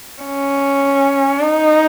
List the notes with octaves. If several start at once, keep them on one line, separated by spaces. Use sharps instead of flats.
C#4
D#4